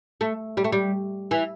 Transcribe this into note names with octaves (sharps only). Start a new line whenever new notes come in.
A3
G3
A3
G3
E3